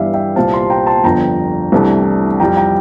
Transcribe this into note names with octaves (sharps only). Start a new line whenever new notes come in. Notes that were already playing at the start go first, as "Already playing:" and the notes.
Already playing: G1 G2 E3 G3 D5 E5 F5
E5 G5
C2 A#2 G3 C4 F5 A5
A5 C6
G5 A#5
A5 C6
G1 F2 D3 F3 G5 A#5
C2 C3 E3 A3 D4
F2 E3 G3 G5 A#5
G5 A#5